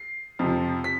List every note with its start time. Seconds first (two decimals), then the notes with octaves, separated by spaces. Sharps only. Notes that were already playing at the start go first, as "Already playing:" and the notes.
Already playing: C7
0.39 F2 C3 F3
0.84 B6